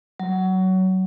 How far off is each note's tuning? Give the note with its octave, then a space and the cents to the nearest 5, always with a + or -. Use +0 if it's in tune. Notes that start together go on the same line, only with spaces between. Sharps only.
F#3 +20